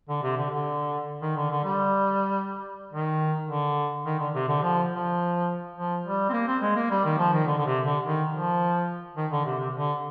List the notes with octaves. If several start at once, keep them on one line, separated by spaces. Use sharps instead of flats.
D3
C3
D3
D3
D#3
D3
D3
G3
D#3
D3
D#3
D3
C3
D3
F3
F3
F3
G3
C4
A#3
C4
G#3
A#3
G3
D#3
F3
D#3
D3
D3
C3
D3
D#3
F3
D#3
D3
C3
C3
D3